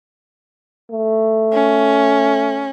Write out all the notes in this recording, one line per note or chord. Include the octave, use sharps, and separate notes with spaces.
A3
C#4